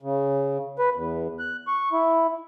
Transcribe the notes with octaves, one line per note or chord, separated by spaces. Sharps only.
C#3
B4
E2
F#6
C#6
E4